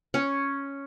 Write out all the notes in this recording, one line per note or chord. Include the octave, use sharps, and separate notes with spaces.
C#4